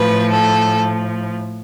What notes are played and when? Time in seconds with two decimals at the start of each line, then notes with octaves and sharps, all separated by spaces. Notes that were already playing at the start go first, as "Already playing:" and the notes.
Already playing: A2 F3 B4
0.33 A4